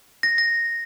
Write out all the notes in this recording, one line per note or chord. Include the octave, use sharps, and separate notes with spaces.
A#6
A#6